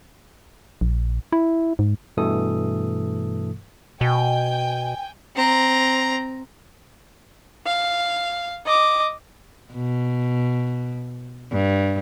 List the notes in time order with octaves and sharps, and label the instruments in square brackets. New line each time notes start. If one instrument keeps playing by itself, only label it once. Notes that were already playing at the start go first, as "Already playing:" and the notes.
[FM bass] A#1
E4
G#2
[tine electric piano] G2 B2 E3 A3 A4 D#6
[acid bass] B2 [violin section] G5 G#5
[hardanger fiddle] C4 A#5
[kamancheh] F5
D#5 D6
[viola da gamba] B2
G2